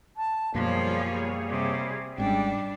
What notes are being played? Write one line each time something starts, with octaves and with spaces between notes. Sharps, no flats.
A5
F#2 B2 F3 G3 A#3 F4 G#4 C#5
C3
G#1 G#2 G3 C#4 D4 G5